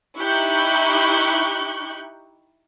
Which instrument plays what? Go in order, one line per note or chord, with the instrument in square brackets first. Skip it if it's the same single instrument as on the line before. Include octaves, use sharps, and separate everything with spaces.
[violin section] D#4 E4 G4 C#6 F#6 G6